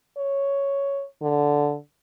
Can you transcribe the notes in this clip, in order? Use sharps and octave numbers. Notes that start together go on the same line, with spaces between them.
C#5
D3